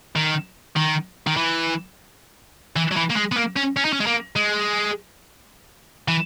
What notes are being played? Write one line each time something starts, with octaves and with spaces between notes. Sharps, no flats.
D#3
D#3
D#3
E3
E3
F#3
E3
A#3
G#3
B3
A#3
C#4
C#4
D#4
C#4
G#3
A#3
G#3
E3